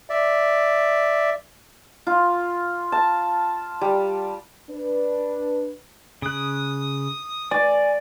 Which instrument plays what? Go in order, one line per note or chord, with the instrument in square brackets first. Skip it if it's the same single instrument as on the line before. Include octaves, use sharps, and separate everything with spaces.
[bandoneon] D5 E5
[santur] F4
A5
G3
[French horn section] D4 B4
[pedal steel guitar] C#3 F#6 [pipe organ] D#6
[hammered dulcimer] D5 [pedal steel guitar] G#5